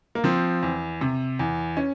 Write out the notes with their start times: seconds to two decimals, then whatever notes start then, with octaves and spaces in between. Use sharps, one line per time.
0.15 A#3
0.24 F3 C4
0.63 E2
1.01 C3
1.39 E2
1.77 C#4